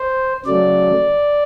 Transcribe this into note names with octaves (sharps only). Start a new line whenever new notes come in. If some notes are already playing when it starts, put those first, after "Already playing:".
Already playing: C5
C#3 F#3 A3 D5